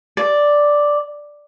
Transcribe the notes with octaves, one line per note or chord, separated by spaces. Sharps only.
D5